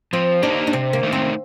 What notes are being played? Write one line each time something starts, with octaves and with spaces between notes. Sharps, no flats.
F3 C4
A#3 D4 D#4 G4
D4
C3 C4
A#3
D#3 A3 D#4 A#4
C4